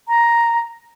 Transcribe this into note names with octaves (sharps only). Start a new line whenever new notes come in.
A#5